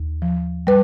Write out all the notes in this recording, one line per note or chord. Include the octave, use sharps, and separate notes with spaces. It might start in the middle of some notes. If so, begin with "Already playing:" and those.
Already playing: D#2
F3
G3 B4